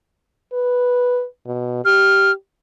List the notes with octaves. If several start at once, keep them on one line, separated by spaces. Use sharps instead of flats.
B4
B2
G4 F6